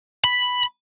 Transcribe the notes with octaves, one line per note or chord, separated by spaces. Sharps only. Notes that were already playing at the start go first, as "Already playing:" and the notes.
B5